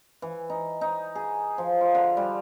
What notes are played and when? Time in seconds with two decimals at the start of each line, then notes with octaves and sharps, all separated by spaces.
0.22 E3
0.50 D#4
0.81 D#4
1.15 G#4
1.58 F3
1.81 F4
1.94 D3
2.17 G3